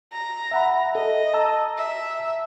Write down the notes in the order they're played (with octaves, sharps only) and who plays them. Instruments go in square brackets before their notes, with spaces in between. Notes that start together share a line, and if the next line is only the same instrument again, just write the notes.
[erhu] A#5
[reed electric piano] E5 F#5 B5
[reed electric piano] A4 [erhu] D#5
[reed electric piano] A5 A#5 E6
[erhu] E5